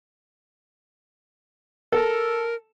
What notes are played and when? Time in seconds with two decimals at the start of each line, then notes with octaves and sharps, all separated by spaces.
1.92 A4 A#4